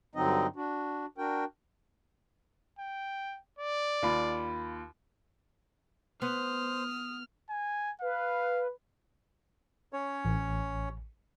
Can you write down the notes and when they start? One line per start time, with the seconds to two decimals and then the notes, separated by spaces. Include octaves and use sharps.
0.15 G2 D3 F#3 C4 D#4 D#5
0.56 D4 F#4
1.18 D4 F#4 A#4 G5
2.79 G5
3.59 D5
4.02 D#2 F4 B5
6.22 B3 C5 D#6 F6
7.50 G#5
8.02 B4 F5
9.93 C#4 C#5
10.25 A1